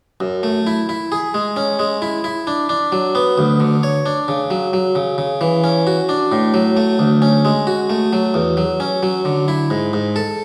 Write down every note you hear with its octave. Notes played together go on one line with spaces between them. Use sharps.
F#2
A3
E4
E4
G#4
G#3
C#4
G#3
E4
E4
D4
D4
F#3
B3
D2
D3
C#5
D4
C#3
F#3
F#3
C#3
C#3
E3
C#4
F#4
D4
A2
F#3
A3
D2
C#4
G#3
F#4
A3
F#3
E2
F#3
C#4
F#3
D3
E4
G#2
G#2
A4